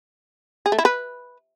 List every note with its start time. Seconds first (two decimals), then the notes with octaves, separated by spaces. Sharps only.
0.66 G#4
0.72 A3
0.79 E4
0.85 B4